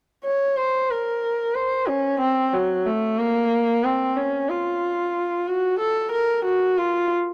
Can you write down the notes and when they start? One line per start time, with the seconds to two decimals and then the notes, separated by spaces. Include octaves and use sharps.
0.24 C#5
0.57 C5
0.90 A#4
1.55 C5
1.88 C#4
2.20 C4
2.53 F#3
2.86 A3
3.18 A#3
3.84 C4
4.17 C#4
4.49 F4
5.48 F#4
5.80 A4
6.12 A#4
6.45 F#4
6.78 F4